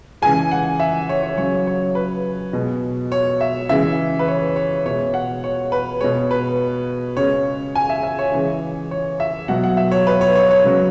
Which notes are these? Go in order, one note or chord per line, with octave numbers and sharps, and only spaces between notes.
C#3 E3 G#3 G#5
F#5
E5
C#5
C#5
C#3 F#3 C#5
C#5
B4
B2 G#3
C#5
E5
C#3 E3 G#3 E5
B4
C#5
C#5
B2 G#3 C#5
F#5
C#5
B4
B2 G#3 C#5
B4
C#3 G#3 C#5
G#5
E5
E5
C#5
C#3 E3 G#3
C#5
E5
B2 F#3 F#5
F#5
E5
C#5
B4
C#5
C#5
C#5
C#3 F#3